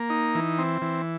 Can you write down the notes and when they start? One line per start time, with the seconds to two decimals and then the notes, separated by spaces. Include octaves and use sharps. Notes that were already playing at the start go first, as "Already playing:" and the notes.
Already playing: A#3
0.10 D#4
0.35 E3
0.59 C4
0.82 E3